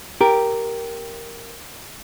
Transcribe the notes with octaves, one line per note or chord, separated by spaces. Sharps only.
G4 A#4